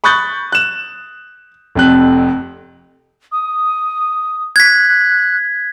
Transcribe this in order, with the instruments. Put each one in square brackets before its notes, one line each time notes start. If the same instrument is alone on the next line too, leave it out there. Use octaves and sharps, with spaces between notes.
[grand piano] B5 C#6 D#6 F#6 G6 A6
F#6 E7
F1 F2 F#6
[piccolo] D#6
[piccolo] F#6 [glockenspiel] G#6 B6